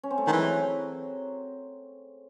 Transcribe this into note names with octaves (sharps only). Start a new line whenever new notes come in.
C#4
C4
A3
D#3 G#3
E3 F#3